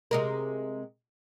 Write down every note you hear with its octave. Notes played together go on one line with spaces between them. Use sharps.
C3 G#3 A#4